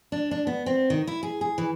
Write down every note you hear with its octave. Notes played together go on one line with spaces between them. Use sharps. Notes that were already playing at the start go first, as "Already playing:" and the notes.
D4
D4
B3
C4
D#3
E4
G#4
G#4
E3